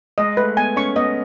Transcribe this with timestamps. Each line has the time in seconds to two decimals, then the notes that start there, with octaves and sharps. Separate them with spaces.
0.18 G#3 D#5
0.37 A3 B4
0.57 B3 G#5
0.76 C#4 C#6
0.96 B3 D#5